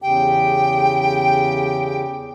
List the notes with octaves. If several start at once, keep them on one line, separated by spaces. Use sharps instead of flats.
E2 C#3 G4 G5